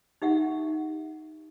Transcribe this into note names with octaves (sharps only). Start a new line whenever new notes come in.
D#4 G4 E5 F#5